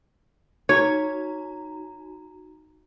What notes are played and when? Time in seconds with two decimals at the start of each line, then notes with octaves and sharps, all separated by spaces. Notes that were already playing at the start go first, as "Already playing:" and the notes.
0.69 D#4 F#4 C#5 A#5